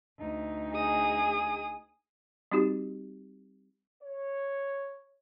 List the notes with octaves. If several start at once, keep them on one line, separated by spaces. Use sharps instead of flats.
D2 D#4
G#4 D#6
G3 C4 D#4 F#4 G4
C#5